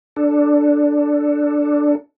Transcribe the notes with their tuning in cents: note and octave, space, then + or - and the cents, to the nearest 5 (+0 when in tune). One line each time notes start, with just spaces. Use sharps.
D4 +0 A4 +0